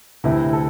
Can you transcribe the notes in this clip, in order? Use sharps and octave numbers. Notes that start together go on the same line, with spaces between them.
D2 C3 E3 A3 E4
A4